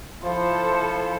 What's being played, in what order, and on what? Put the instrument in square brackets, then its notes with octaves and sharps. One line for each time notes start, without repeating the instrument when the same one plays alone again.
[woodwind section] F3 [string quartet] E4 A4 [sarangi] C5